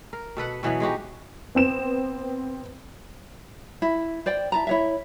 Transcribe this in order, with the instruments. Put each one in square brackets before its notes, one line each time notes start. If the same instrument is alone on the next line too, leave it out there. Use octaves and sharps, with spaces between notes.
[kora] A#4
B2 A4 B4 F#5
B2 E3 F#3 B3
G#3 D#4 F#4 G4
[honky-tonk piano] B3 C4 E7
[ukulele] E4
C5 D5 G5
E4 A5 A#5
E4 C#5 E5